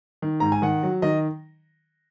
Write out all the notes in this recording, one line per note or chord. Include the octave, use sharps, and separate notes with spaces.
D#3
G#2 A#5
G#5
D#3 F#5
F#3
D#3 D#5